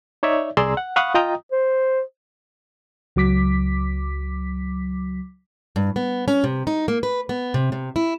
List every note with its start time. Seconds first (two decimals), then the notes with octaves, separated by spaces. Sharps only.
0.23 D#4 C#5 D5 E5
0.57 C2 G#4 D5 A#5 C6 E6
0.77 F#5
0.96 F5 F#5 B5 C#6 D#6 F#6
1.15 F4 D#5 G5 A#5 D#6
1.52 C5
3.16 C#2 F#3 D6 B6
5.76 G2
5.96 B3
6.28 C#4
6.44 C3
6.67 D#4
6.88 A#3
7.03 B4
7.29 B3
7.54 C3
7.72 C3
7.96 E4